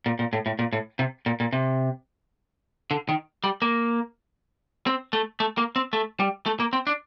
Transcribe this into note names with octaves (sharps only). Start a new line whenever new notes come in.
A#2
A#2
A2
A2
A#2
A2
C3
A#2
A#2
C3
D3
D#3
G3
A#3
C4
A3
A3
A#3
C4
A3
G3
A3
A#3
C4
D4